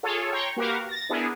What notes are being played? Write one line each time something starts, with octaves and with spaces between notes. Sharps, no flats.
F4 G#4 A4 C#5
C#5 G5 A#5 C6 C#6
A#3 F#4 G4 A#4 B4 F5
A6 A#6
B3 D4 E4 G#4 A#4